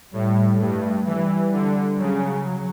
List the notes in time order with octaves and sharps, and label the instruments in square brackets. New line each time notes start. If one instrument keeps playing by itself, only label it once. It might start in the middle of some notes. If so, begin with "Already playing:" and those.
[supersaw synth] A2 [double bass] G3
[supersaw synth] G2 [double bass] A3
[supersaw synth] E3 [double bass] G3
[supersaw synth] D3
[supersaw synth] C#3 [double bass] F#3